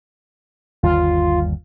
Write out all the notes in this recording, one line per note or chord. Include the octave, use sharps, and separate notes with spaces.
G1 D#2 G3 F4